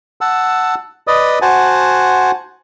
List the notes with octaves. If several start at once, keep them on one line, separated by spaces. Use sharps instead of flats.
F#5 A5 E6
B4 D5 D#5 D#6
F#4 C5 F#5 G#5 A5